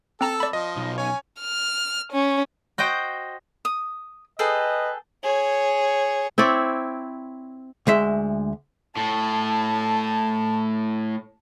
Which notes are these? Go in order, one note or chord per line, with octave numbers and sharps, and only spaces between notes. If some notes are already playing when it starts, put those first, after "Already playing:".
C4 A4 A#5 E6
D5 B5
F3 D#5
B1
C#4 C#5 G#5
F6
C#4
F#4 C5 D#5 G5
D#6
G#4 A4 B4 D#5 G5
G#4 C#5
C4 E4 C#5 D5
D2 G#3 E5
A2 A5